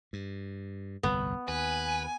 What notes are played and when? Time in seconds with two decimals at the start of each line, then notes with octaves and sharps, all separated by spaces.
0.13 G2
1.03 G1 C2 F2 B3
1.48 D#2 B4 G#5